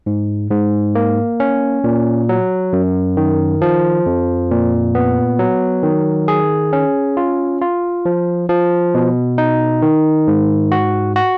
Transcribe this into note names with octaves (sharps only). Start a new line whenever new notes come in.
G#2
G#2
A#3
C#4
A#2
F#3
F#2
D#3
F3
F2
A#2
B3
F#3
D#3
G#4
C#4
F4
F4
F3
F3
B2
D#4
D#3
G#2
F#4
F#4